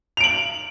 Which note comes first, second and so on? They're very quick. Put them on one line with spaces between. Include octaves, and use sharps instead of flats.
F7 D7 F#7